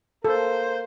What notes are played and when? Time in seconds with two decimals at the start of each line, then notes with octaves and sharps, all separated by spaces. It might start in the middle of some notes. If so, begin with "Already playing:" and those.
0.25 A#3 A4 C5